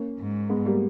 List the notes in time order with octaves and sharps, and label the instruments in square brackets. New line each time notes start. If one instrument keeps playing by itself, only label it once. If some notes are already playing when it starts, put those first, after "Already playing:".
Already playing: [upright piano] A#3 C#4
[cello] G#2
[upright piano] G#3 B3
G3 A#3